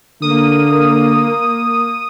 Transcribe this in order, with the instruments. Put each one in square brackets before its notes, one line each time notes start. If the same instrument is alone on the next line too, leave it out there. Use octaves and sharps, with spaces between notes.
[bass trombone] D3 [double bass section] A#3 [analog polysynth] D#6